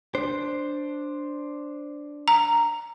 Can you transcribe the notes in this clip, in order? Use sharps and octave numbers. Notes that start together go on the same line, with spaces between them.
D4 C5
A#5